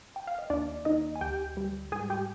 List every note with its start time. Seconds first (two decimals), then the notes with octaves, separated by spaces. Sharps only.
0.16 G5
0.27 F5
0.39 D#5
0.50 D#2 D4 D5
0.85 D#2 D#4 D#5
1.16 G#5
1.21 D2 G4 G5
1.57 G3
1.92 G#2 G#4 G#5
2.10 G4 G5